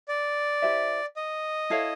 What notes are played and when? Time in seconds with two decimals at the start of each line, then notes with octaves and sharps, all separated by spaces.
0.08 D5
0.62 E4 G4 C5 E5
1.16 D#5
1.70 E4 A4 C#5 F5